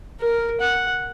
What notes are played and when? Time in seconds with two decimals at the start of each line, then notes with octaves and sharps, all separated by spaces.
0.21 A#4
0.61 F#5